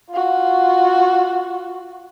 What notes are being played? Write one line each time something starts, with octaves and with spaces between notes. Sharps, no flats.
F4 F#4